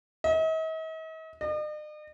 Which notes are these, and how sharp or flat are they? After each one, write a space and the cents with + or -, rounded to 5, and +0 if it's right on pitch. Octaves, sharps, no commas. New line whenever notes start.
D#5 +45
D#5 -45